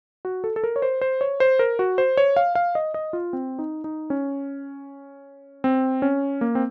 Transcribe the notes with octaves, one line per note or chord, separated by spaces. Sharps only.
F#4
A4
A4
A#4
C#5
C5
C5
C#5
C5
A#4
F#4
C5
C#5
F5
F5
D#5
D#5
F4
C4
D#4
D#4
C#4
C4
C#4
A#3
C4